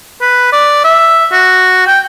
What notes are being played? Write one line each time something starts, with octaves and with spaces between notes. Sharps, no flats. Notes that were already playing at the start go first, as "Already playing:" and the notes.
B4
D5
E5
F#4
G5